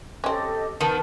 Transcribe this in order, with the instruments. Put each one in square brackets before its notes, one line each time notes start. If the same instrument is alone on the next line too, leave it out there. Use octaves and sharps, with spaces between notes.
[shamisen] C4 C#4 [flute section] G4 A4 D#5
[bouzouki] D#3 B3 [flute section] A#4 B4 A5